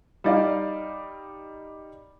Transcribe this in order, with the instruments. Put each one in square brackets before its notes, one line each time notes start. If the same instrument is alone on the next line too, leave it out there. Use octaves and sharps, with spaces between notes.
[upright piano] G3 D#4 D5 D#5 F5